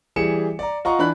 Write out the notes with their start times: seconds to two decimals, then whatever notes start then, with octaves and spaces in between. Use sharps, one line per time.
0.16 E3 G3 G#4 C#7 E7
0.59 D5 A#5
0.85 F4 D#5 F#5 A#5 C#6
0.99 E3 D4 B5 F#6